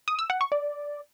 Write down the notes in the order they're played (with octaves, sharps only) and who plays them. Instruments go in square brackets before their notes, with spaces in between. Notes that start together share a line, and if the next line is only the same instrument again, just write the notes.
[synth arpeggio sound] D#6
E6
F#5
C#6
D5